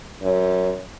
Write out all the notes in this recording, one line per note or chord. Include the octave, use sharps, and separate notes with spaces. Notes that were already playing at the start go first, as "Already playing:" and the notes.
F#2